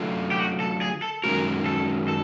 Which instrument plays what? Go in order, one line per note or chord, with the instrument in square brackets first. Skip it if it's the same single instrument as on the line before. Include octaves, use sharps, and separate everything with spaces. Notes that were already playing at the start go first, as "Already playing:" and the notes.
Already playing: [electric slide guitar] D3 F#3 A3 D4 F4
[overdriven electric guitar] G4
F#4
A4
G#4
A4
[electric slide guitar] F#2 D#3 G#3 C#4 F#4 [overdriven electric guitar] A#4
[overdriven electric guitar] A4
A4